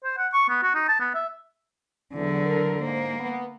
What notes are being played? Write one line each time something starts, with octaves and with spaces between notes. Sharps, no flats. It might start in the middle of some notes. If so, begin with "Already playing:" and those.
C5
F#5
C#6
B3
F#4
D#4
A5
B3
E5
E2 D3 F#3
E2 A4 A#4
G#2 A#3 C5
B3